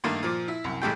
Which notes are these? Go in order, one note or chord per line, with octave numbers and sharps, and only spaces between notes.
G2 D#3 A3 A#3 D#4
A#2 F3 D6
E4
C2 F#2
A1 A2 G#3 A3 G4 G5